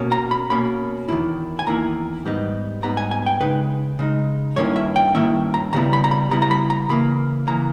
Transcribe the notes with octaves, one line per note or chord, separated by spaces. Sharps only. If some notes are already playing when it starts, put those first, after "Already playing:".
Already playing: B2 A#3 C#4
A#5
B5
B2 A#3 C#4 B5
E2 D#3 A#3 E4
G#5
E2 D#3 A#3 E4 A#5
G#2 G3 B3 D#4
G#2 G3 B3 D#4 A#5
G#5
G#5
G5
C#3 G#3 D#4 B4
C#3 G#3 D#4
G2 D#3 A#3 C#4 E4 C#5
E5
G5
G2 D#3 A#3 C#4 E4 E5
A#5
C#3 G3 B3 E4 A#5
B5
A#5
B5
C#3 G3 B3 E4 A#5
A#5
B5
A#5
C#3 E3 A#3 B5
C#3 E3 A#3 A#5